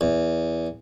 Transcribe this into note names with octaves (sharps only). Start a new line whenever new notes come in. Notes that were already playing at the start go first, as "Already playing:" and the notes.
E2